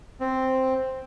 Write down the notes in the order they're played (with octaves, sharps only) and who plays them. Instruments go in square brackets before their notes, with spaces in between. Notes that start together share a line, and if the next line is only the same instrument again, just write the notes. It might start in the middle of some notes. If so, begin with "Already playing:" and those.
[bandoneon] C4